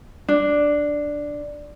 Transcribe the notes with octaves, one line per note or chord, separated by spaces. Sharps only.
D4